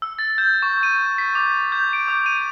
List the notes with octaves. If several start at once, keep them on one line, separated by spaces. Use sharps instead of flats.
E6
A6
G6
C#6
D#7
B6
D6
G6
D7
D6
D#7